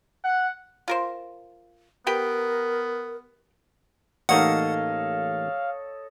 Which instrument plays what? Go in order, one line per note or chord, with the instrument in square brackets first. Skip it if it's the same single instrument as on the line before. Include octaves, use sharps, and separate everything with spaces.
[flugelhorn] F#5
[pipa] F4 A#4 C5
[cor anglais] B3 [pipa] G4 B4 G5 [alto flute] A#4
[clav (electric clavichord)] A1 A#3 D#4 [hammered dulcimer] A4 C#5 D#5 [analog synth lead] F5 [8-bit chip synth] F#5